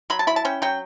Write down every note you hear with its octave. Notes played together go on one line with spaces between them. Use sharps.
F#3 B5
A5
E4 B5
A5
C#4 G5
F#3 G5